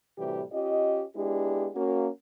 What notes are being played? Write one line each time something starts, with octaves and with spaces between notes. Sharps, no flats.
A2 C3 E3 G3 F#4 G4
C#4 F4 G4 D#5
G#3 B3 D4 E4 G4
A#3 C#4 F#4